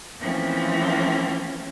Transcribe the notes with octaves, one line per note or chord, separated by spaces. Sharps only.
E3 F3 A3 A#3 C4 C#4